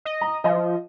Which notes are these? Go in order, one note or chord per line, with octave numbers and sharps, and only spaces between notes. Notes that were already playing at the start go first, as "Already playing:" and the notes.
D#5
A#5
F3 D#5